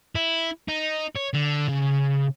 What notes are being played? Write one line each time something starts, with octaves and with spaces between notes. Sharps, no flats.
E4
D#4
C#5
D3
C#3